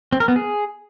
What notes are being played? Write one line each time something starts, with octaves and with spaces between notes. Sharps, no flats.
C4
A#4
B3
G#4